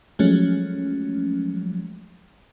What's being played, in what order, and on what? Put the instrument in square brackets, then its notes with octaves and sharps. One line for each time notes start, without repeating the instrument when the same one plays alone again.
[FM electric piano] F3 F#3 G#3 A3 C#4